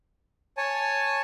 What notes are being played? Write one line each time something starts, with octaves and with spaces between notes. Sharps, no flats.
C#5 G#5 A5